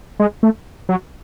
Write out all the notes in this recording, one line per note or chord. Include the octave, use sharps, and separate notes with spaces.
G#3
A3
F#3